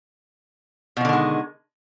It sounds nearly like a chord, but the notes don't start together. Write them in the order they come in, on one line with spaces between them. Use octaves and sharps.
B2 F3 D3 D#3 G#3